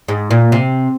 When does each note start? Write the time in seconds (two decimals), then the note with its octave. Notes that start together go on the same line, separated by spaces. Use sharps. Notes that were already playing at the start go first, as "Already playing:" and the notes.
0.08 G#2
0.31 A#2
0.52 C3